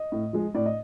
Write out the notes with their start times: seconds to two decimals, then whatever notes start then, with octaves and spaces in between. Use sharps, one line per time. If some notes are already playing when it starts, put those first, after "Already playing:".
Already playing: D#5
0.12 A2
0.33 F3 G#3
0.54 A2 D5
0.66 D#5